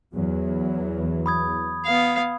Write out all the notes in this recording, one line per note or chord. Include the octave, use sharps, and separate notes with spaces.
E2 E3 F#3
B5 D#6 G#6
B3 F5